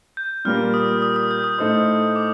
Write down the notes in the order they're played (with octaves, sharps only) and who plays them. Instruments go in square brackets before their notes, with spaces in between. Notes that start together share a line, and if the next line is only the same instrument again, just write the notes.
[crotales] G6
[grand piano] A#2 G3 A#3 F4 A#4 [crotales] F6
[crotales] D#6
D#6
D#6
G6
D#6
[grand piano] A2 A3 D#4 A4 C5
[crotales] D6